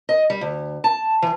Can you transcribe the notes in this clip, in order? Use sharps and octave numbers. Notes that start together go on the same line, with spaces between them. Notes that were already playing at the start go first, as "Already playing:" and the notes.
D#5
G3
D2
A5
E3